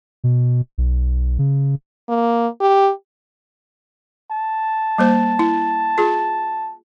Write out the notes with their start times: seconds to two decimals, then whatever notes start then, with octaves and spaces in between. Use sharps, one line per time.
0.24 B2
0.78 B1
1.39 C#3
2.09 A#3
2.60 G4
4.31 A5
4.98 G3 A#3 C5
5.39 E4
5.98 F4 G#4